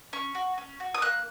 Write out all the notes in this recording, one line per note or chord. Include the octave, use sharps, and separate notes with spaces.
C#4 C#6
F#4
C#4
F#4
D#6
A#3 F#6